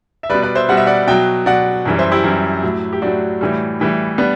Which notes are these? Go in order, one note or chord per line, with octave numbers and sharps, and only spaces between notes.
E5
B2 G3 B4 D5
B4 D5
C5 E5
B2 G3 F#5
E5
D5 F#5
B2 F#3 E5 G5
B2 F#3 D5 F#5
F#2 E3 G3
C5 E5
E4 G4
F#2 E3 G3
A2 F#3
G4
A2 F#3 D4 F#4
A2 E3 G3
A2 E3 G3
G3 B3 D4